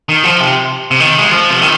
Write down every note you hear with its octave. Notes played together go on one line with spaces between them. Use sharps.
D#3
F3
C3
C3
D#3
G#3
F3
C3
D#3